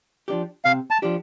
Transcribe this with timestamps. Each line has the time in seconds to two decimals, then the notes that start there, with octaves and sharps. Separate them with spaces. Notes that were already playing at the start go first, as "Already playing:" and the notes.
0.28 F3 D4 G4
0.65 C3 F5
0.91 A5
1.02 F3 D4 G4